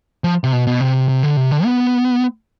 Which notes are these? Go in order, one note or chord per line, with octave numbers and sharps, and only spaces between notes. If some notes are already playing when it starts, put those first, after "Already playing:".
F3
C3
B2
B2
C3
C3
D3
C3
D3
B3